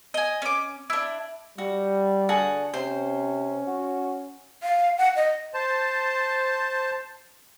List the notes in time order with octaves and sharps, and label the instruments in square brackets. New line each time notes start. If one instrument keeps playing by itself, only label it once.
[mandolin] D#5 G#5
C#4 D6
D4 E4
[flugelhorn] G3 [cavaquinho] F#4
[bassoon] D3 [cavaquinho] F#4 G#4 A5
[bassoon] C3 [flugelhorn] C#4 [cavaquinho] C5
[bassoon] F#4
[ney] F5
F#5
D#5
[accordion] C5 A5